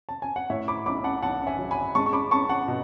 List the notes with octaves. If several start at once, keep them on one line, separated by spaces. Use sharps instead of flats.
A5
G#5
F#5
A2 C#5 E5
B5 D6
B1 B5 D6
F#5 A5
B1 F#5 A5
E5 G#5
F#3
G#5 B5
G#3 A5 C#6
C#6
B5 D6
C#4 A5 C#6
F#5 A5
B2